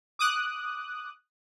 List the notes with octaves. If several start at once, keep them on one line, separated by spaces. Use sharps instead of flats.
D6 D#6 F#6